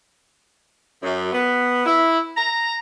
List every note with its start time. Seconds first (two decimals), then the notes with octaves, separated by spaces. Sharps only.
1.03 F#2
1.32 B3
1.86 E4
2.36 A#5